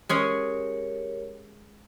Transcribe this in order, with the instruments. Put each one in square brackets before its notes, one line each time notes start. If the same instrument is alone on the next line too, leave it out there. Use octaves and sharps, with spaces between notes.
[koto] G#3 C#4 G#4 [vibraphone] G4 A#4 C#5